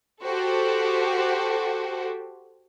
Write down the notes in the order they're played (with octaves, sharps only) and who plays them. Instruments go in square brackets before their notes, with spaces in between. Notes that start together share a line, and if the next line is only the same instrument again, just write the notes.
[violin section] F#4 G4 A4 C5